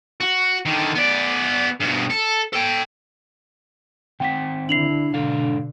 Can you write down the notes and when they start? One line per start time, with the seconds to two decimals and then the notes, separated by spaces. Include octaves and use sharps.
0.20 F#4
0.65 D3 D#3
0.95 B3 D5
1.80 G2 B2
2.10 A4
2.53 A4 G5
4.20 D#3 C4 F#5 G5 B6
4.69 D3 D4 E4 C7 F7 F#7
5.14 G#2 B2 D3 A4 F5